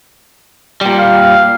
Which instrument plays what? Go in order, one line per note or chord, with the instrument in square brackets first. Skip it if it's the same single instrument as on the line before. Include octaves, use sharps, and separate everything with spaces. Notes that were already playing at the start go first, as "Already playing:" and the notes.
[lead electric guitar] A#2 G3
[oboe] F5